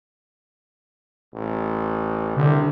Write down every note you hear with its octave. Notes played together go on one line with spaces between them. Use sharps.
A1
C2 D3